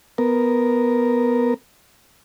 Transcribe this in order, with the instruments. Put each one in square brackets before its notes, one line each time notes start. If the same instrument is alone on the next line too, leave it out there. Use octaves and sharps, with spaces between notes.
[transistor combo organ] B3 A#4